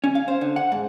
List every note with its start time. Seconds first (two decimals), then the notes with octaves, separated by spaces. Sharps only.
0.04 C#4
0.15 F5
0.28 C5
0.41 D3
0.56 F#5
0.72 G#2